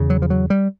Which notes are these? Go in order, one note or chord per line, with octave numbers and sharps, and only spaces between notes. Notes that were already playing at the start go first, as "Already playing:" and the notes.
Already playing: E2 C#3
F#3
F3
F#3
G3